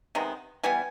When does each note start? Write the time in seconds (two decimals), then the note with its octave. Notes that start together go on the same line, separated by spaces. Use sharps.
0.15 C3 D#3 G#3 B3
0.64 E3 G3 B3 G#5